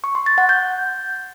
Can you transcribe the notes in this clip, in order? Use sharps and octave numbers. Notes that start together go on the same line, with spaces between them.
C#6
C6
A6
F#5
G6